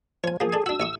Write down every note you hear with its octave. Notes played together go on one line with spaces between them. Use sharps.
F3 C#5 G#5
F3 A#3 G#4
A4 D5 G#5
D4 F#4 E6
A1 C#6 D#6